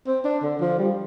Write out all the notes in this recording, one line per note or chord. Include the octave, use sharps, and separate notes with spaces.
C4
D4
D3
F3
G3